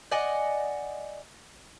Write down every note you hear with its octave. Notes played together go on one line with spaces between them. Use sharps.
D5 D#5 F#5 G#5